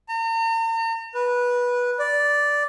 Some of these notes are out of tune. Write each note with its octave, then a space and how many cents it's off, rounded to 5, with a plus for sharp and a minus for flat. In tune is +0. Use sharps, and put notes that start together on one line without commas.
A#5 -45
B4 -15
D5 -5